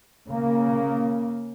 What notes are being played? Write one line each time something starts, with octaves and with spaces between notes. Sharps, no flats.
C#3 A#3